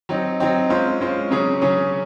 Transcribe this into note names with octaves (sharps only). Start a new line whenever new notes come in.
F#3 C4 D#4
F#3 C4 D#4
G#3 C#4 F4 C5
G#3 C#4 F4 C5
C#3 F#3 C#4 G#4 C#5
C#3 F#3 C#4 G#4 C#5